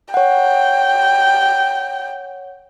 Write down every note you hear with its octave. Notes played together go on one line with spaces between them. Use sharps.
C#5 F#5 G5